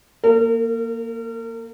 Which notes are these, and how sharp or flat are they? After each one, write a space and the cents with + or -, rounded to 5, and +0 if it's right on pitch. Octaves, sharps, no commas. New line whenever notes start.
A#3 +0 A#4 -40